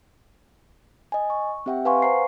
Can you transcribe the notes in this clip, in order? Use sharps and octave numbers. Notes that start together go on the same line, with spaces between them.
D#5 G#5
C#6
C4 G4 E5 F#5 G5
B4 F5 F#5 G#5 C6 C#6
C5 A#5 C7